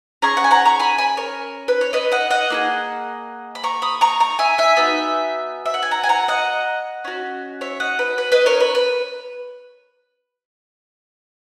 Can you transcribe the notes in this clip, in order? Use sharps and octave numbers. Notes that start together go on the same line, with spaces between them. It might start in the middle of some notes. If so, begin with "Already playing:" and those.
C#4 G#4 A#5 C#6
F#5
G#5
F#5 A#5
A#5 C#6
G#5 B5
G#5 B5
A#4 C#5
B4
C#5
B4 D#5
D#5 F#5
D#5 F#5
A#3 E4 G#4
B5
A#5 C#6
B5 D#6
A#5 C#6
A#5 C#6
E5 G#5
E5 G#5
B3 D#4 F#4
E5
F#5
G#5
F#5 A#5
G#5
F#5 A#5
D#5 F#5
C#4 F#4
C#5 E5
D#5 F#5
B4
B4
B4 D#5
A#4 C#5
B4
B4